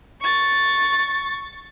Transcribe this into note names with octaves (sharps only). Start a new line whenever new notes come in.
C#6 A6